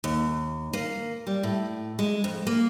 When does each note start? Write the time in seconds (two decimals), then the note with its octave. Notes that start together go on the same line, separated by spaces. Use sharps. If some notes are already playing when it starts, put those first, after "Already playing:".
0.04 D#2
0.73 A#3
1.27 G3
1.43 A2
1.99 G#3
2.24 F2
2.47 A#3